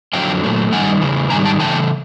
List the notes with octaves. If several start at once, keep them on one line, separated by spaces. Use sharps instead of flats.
F2 D3 F#3 F5 G5
A#2 F#3 A3
G2 D#3 G3 F#5 G#5
E2 C#3 E3
G#2 D#3 G3 G#5 A#5
G5 A5
C#3 E3 A3 G5 A5